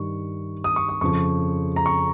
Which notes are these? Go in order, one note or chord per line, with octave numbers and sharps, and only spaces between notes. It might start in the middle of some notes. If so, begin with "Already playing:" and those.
Already playing: G2 D#3 C#6
D#6
C#6
D#6
F2 C#3 F3 C#6
A#5
C#6